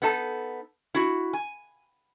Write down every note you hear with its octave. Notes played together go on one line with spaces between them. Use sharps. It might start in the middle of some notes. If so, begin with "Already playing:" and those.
B3 D#4 A4 A5
E4 F#4
G#5